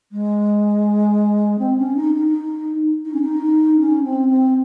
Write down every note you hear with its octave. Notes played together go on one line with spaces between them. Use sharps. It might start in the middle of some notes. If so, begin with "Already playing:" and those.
G#3
C4
C#4
D#4
D#4
D#4
C#4
D#4
C#4
C4
C4